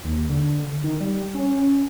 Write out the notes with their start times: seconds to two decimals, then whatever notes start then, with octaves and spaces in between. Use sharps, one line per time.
0.04 D#2
0.29 D3
0.84 D#3
1.01 G3
1.34 C#4